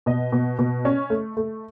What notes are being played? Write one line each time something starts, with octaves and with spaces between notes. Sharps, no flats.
B2 D#5
B2
B2
C#4
A3
A3